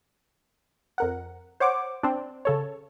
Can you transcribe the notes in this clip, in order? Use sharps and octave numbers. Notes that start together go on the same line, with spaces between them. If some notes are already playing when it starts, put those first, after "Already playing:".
F2 A#4 F#5
C5 C#5 F#5 D6
C4 D4
C#3 A4 C#5